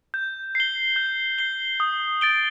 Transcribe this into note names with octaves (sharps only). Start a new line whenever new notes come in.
G6
C7 G7
G6
C7 G7
D#6
A6 D7 G7